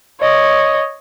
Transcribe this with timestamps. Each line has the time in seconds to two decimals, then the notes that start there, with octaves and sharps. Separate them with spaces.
0.21 C#5 D#5